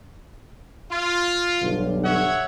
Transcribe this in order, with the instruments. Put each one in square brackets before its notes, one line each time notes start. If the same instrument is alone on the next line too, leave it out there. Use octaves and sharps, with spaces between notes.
[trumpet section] F4
[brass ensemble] B1 G2 D3
[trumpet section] C#5 E5 F#5